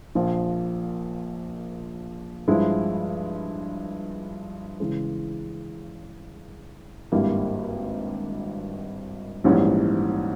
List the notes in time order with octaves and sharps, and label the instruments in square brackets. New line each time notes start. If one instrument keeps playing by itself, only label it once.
[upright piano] A#1 A#2 F3
G2 F3 G#3 E4
C#3 E3 G#3
G#1 G2 G3 A#3 E4
A#1 G#2 E3 G3 C#4